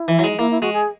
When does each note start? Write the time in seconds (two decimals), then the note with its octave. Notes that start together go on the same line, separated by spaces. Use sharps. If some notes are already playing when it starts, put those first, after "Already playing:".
Already playing: E4
0.08 E3
0.19 F#3
0.24 G#3
0.38 A#3 E4
0.51 E4
0.61 G#3 F#4
0.73 G#4